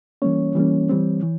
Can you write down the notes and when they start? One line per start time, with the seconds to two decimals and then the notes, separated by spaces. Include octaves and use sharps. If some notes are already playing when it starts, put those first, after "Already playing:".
0.22 E3 G3 A#3 C#4 C#5
0.55 E3 G3 A#3 C#4
0.89 E3 G3 C4
1.23 E3